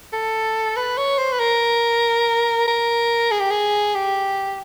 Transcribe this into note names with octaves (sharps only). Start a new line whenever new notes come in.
A4
B4
C#5
C5
B4
A#4
A#4
G#4
G4
G#4
G4